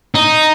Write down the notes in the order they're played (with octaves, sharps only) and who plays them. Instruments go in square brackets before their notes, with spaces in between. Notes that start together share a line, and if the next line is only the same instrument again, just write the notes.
[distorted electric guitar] D#4